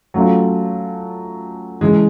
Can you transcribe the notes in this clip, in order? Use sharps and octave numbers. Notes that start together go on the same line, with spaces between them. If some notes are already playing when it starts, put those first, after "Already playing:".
F#3 A3 C#4 F4
C#3 E3 G#3